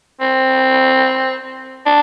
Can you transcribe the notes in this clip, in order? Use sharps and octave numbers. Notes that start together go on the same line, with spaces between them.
C4
D4